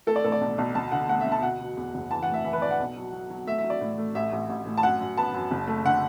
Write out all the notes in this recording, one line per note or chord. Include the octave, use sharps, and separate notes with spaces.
A3 A4
D5
A2 A4
D5
B1
B1
D2 A5
D3 F#5
A3 F#5
E5
D2
A5
B2 F#5
B2
E2
F#1
E3 A5
F#5
A2
E5
E3 E5
B4
B3 D5
F#5
B1
F#3
F#3
F#3
A3 E5
E5
F#3
D5
A2
A3
A1 E5
A1
A1
A2
A5
F#2 F#5
F#2
B3 A5
F#2
F#1
A3
D3 F#5